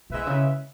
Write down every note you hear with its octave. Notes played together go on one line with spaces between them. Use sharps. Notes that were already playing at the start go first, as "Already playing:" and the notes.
B2 G#3 E4 B4 E5
C#3